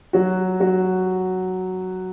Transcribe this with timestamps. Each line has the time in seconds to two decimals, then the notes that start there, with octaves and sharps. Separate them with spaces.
0.13 F#3 F#4
0.60 F#3 F#4